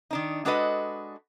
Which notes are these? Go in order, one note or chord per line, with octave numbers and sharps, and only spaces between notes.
D#3 D4 D#4
G#3 D4 F#4 A4 B4 D#5